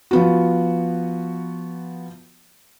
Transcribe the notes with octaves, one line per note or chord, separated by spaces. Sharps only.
F3 B3 F#4